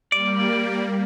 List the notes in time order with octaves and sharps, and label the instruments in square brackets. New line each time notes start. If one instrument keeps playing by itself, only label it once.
[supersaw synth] G3 A#3 [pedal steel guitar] D5